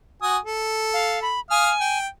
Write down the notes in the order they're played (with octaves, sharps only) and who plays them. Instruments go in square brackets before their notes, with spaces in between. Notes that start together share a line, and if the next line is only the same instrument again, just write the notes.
[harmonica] F#4 G#5 D#6
A4
[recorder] F5
B5
[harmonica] F5 D#6 F6 [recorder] G#5
[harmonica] G5